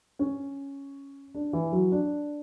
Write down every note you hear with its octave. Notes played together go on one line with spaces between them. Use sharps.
C#4
D4
E3
F#3
D4